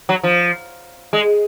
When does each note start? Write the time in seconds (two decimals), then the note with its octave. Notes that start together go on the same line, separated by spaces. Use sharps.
0.09 F#3
0.23 F3
1.13 G#3